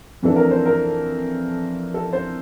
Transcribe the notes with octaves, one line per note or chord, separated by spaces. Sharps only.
F2 E3 A3 D4 A4
A#4
C5
A#4
A4
C5